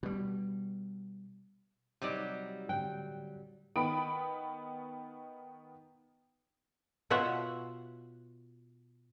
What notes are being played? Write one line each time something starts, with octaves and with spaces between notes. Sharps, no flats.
B2 G3
C3 F#3 G3 D#4 D5 D#5
A2 D3 G5 F#6
D#3 B3 B5 D#6 D7
B2 F4 C#5 E5 F#5